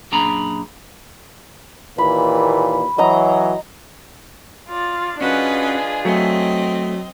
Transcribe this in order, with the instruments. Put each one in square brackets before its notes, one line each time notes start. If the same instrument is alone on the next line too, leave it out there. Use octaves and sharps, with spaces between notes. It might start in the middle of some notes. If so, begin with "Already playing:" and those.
[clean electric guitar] F#2 A#2 D4 G#4 A#5 B5
[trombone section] D#2 A#2 E3 [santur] B5
[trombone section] E3 F#3 [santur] D#5 A#5
[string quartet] F4 D5 A6
[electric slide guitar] C#4 F#4 [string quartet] D4 F4 G#4 [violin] B4 D#5
[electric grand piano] F#3 [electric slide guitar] A3 [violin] C4 D#5